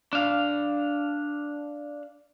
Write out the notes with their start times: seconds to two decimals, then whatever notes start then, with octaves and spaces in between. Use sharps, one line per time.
0.13 D4 F5